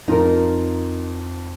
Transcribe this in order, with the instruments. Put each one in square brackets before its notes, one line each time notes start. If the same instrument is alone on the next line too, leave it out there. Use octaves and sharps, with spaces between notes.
[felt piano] F2 F4 [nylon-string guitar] D#4 A#4